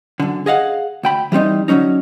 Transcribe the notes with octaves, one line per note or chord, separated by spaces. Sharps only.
F#2 D3
G#4 D#5 F5 F#5
D2 G5 B5
E3 G3 C4 D#4
D3 D#3 F#3 C#4 D#4